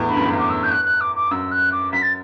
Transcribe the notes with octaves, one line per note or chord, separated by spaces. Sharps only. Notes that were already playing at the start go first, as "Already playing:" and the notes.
Already playing: E2 A2
G2 B5
F#2
E2
F#2
D6
E6
G6
F#6
F#6
D6
D6
F#2 E6
F#6
D6
F#2 B6
A6